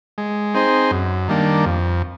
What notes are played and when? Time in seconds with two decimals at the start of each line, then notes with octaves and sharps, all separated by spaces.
0.18 G#3
0.54 C4 D#4 G#4 C5
0.91 F#2
1.28 D#3 G3 A#3 D4
1.65 F2